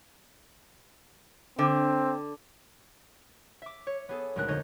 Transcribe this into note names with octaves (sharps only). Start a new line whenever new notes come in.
D3 C4
E5 D6
C#5
B3 G#4 A4
D#1 D2 G#3 A#4 F#6
F2 D3 D#4 C#5 D#5 G6